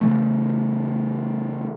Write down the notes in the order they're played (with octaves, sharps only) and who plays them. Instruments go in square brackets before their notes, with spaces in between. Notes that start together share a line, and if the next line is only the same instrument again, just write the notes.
[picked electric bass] C#3 E3 A3